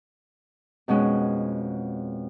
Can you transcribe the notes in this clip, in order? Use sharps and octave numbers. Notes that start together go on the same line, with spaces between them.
F2 B2 G#3 C#4